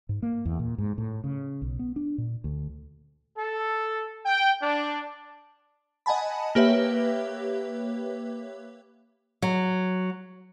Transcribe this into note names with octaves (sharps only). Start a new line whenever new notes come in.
G#2
A#3
E2
A#2
G#2
A2
C#3
B1
B3
D4
A#2
D2
A4
G5
D4
D#5 F#5 G#5 A5 B5
A#3 G4 B4 C#5 E5
F#3